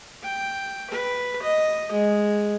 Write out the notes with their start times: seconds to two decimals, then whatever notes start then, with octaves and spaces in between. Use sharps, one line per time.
0.23 G5
0.91 B4
1.43 D#5
1.92 G#3